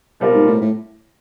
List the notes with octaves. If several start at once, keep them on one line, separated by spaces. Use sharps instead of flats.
B2 G3 C4 F4 A#4
G#2
A2
A2